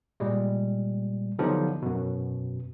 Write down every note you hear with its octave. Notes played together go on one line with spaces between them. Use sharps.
A#2 G3 G#3
D3 F3 F#3 B3 D#4 G4
F#2 B2